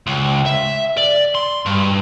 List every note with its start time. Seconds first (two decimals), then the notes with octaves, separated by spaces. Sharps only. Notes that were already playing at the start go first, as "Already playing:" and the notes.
0.07 C#2
0.46 E5
0.97 D5
1.35 C6
1.66 G2